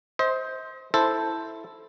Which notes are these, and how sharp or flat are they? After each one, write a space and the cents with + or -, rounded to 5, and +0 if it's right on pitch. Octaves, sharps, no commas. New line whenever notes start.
C5 +0 D#5 +40
E4 +0 A4 +0 C5 +0